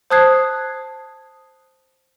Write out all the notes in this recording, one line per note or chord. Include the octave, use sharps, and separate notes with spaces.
C5 A5 D#6 F#6 G#6 C7